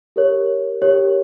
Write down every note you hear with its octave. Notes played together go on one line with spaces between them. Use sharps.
G4 A#4 C#5
G4 A#4 C#5